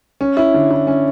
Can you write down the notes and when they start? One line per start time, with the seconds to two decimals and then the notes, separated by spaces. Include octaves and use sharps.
0.21 C#4
0.37 E4
0.54 D3
0.71 E4
0.87 C#4